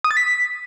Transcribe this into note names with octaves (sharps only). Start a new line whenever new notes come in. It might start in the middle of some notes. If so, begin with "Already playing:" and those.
D#6
A6
B6